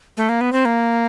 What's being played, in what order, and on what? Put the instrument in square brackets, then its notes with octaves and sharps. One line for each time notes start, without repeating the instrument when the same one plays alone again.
[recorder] A3
A#3
B3
C4
A#3